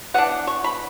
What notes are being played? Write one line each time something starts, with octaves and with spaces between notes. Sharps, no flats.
E3 B3 D4 F#5
C#6
B5